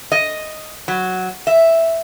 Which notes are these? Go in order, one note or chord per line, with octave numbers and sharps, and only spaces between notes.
D#5
F#3
E5